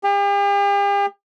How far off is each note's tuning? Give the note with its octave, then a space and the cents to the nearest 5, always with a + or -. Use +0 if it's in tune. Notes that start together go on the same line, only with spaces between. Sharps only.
G4 +45